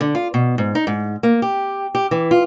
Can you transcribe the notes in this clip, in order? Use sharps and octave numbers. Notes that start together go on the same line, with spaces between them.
D3
F4
B2
G#2
D#4
G#2
A#3
G4
G4
E3
F4